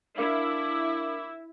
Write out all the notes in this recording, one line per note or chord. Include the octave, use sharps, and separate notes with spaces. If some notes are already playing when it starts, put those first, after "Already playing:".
D4 E4 A#4 F5 D6